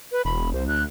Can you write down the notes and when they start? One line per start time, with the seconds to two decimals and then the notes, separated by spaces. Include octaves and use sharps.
0.12 B4
0.25 E1 B5
0.53 C2 C5
0.68 D2 F#6